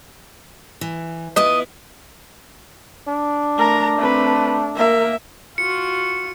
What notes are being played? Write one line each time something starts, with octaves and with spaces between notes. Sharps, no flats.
E3
B3 E4 F4 D#5
D4
A3 A#4 A#5
A3 C4 B4
A#3 A#4 E5
F4 F#4 C#7